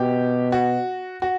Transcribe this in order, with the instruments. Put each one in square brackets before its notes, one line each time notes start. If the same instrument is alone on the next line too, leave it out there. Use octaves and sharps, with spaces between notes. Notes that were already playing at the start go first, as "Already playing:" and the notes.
Already playing: [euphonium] B2 [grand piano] G4
[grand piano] F#4
F#4